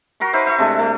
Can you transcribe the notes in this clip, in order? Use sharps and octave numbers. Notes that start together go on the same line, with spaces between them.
F#4 A#4 C6 C#6
D#4 B4 C5 E5
E5 C#6
C3 G#3 A3 D4
A3